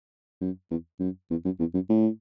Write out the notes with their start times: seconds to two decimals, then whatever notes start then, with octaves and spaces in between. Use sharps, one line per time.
0.41 F#2
0.71 E2
1.00 F#2
1.31 E2
1.45 F#2
1.60 E2
1.74 F#2
1.89 A2